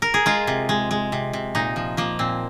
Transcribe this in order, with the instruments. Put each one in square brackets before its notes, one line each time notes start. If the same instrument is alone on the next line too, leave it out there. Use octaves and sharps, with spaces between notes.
[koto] A#4
G#4
G#3 F4
C3
G#3
G#3
C3
C3
A#2 D#4
F3
F3 A#3
A#2 C4